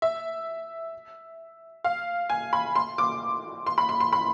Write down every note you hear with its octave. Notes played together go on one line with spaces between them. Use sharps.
E5
F5
G#5
B5
C6
D6
C6
B5
C6
C6
B5